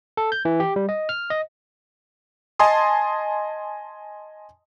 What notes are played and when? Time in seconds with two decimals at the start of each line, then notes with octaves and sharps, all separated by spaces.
0.17 A4
0.32 G6
0.45 E3
0.60 G4
0.76 G3
0.89 D#5
1.09 F6
1.30 D#5
2.59 D#5 G#5 A5 C6 D#6